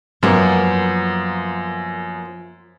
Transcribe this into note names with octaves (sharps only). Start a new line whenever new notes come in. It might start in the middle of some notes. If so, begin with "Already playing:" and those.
F#2 F3 A#3 B3